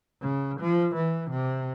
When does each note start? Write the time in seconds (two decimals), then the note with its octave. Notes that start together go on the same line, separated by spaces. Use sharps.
0.21 C#3
0.60 F3
0.95 E3
1.30 C3